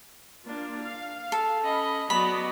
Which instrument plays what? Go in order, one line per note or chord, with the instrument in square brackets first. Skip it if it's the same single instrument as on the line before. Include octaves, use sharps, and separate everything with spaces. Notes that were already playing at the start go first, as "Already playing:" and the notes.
[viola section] A#3 D4 F4
F5
[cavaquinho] A4
[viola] C#4 D#5 [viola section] B5
[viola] F#3 B3 [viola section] F#4 D5 D#5 [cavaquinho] B5